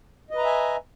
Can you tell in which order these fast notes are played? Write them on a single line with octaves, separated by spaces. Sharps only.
D#5 B4 A#5 E5 G#5